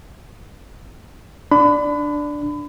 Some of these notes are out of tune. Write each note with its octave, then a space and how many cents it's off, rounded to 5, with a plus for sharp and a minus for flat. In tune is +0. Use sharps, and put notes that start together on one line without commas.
D4 +0 B5 +30